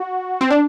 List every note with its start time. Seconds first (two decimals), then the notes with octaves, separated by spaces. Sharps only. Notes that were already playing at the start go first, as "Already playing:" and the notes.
Already playing: F#4
0.41 C4
0.51 D4